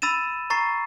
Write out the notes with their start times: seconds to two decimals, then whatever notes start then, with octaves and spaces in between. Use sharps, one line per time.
0.02 B5 E6 A6 D#7 E7
0.50 A#5 C#6 A6 C7